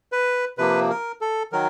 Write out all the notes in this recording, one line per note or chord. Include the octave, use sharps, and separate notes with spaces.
B4
C3 F3 A#3 B4
A#4
A4
D#3 F#3 A#4